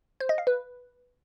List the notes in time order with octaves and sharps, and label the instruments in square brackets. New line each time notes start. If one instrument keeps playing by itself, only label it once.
[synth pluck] C5
D#5
F5
B4